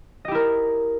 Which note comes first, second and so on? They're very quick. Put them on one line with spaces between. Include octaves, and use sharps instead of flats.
D#5 G4 E4 A#4